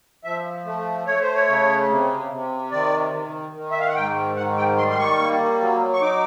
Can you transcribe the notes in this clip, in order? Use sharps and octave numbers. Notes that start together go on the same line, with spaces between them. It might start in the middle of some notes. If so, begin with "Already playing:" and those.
F3 E5
A3
A3 C#5
C5
C#5
C#3
C3
C3
D#3 D5
D#3
D#3
E5
F5
F#5
G#2 G5
D#3 F#5
G5
G3 C6
C6
C#6
A#3
F#3
C#6
D#4 D6